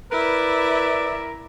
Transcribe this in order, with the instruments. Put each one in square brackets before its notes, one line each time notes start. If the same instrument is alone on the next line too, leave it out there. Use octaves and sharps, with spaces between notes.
[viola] E4 E5 [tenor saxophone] A#4 [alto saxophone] B4 [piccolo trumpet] D5